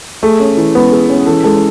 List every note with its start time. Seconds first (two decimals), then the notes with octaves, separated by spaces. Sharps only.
0.23 A3 G#4
0.40 C#4
0.57 E3
0.75 G#3 B3
0.92 G#4
1.09 C#4
1.26 E3 A4
1.44 G#3 A4